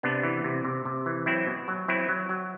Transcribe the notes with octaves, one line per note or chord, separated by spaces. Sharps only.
C3 B3 D4
E3
C3
C3
C3
E3
F#3 C4 E4
B2
F#3
F#3 C4 E4
F#3
F#3